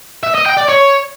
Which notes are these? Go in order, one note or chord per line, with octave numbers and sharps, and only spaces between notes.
E5
D#5
G5
D5
C#5